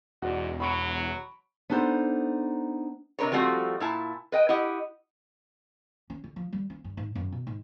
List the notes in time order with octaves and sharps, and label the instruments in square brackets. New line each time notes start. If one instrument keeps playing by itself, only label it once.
[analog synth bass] E1 [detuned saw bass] E2 [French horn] G#2 [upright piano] F#4 D5
[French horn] F#3 [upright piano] B5 C#6 D7
[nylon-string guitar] B3 D4 D#4 A4 C5
[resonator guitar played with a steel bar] C3 D4 A#4 B4 C#5
F3 G3 A3 C4 F#4
A#2 E4 A5
B4 D#5 G5
E4 G4 D#5 F#5
[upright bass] C#4
D3
F3
G3
C#4
G2
G#2
F#2
B2
G#2